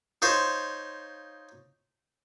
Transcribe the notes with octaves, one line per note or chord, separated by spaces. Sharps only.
D#4 F4 C5 C#5